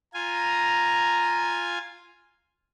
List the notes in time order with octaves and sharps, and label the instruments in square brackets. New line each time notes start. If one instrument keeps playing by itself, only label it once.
[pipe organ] F4 G#5 [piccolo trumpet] A#5